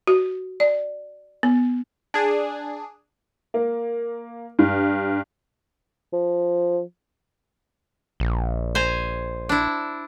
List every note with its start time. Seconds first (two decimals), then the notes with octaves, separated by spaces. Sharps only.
0.07 F#4
0.60 D5
1.43 B3
2.14 D4 G#4
3.54 A#3
4.59 G2
6.13 F3
8.20 A#1
8.75 C5 G#5 A#5
9.49 D4 E4